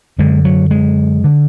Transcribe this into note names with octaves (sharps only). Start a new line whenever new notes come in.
F#2 D3 G#3
F#3
G#3
D3